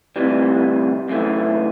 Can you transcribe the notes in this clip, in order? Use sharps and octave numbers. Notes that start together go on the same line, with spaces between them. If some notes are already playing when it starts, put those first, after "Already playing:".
D2 C3 E3 G3
F#2 C#3 E3 A3